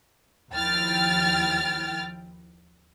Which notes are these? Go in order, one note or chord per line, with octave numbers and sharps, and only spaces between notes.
D#2 F3 E4 G5 F6 A6